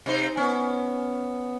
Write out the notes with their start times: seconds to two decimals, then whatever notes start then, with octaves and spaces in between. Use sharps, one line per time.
0.06 C3 D#4 C5
0.37 B3 C#4